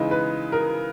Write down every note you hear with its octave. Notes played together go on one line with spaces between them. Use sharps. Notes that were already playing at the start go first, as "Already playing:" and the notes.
Already playing: C#3 E3 G#3 D#4
B4
A#4